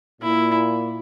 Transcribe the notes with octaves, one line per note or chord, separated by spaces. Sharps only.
A#2 E4